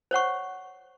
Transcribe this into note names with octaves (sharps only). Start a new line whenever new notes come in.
C5 C#5 F#5 C#6